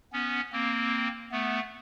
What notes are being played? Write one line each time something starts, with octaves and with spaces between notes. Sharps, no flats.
B3 C#4
A#3 C4
A3 B3